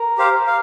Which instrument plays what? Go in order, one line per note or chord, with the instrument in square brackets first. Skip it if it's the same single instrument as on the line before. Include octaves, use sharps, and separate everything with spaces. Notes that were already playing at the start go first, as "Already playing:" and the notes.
Already playing: [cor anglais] A#4
[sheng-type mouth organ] G4 C5 F5
F5